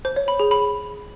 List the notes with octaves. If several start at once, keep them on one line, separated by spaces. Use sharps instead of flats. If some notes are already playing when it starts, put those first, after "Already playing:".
C5
C#5
B5
G#4
B5